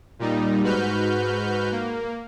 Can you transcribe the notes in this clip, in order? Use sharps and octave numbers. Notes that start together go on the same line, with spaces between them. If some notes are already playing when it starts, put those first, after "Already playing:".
A#2 G3 D#4
G#2 F#4 B4 F6 G6
A#3